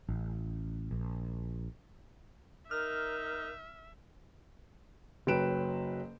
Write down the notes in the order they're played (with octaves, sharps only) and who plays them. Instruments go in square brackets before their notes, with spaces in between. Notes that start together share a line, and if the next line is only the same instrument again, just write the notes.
[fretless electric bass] A1
A#1
[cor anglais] D#4 [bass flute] A#4 [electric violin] E5 [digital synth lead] F6
[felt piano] F#1 F#3 B4 G5 D7 E7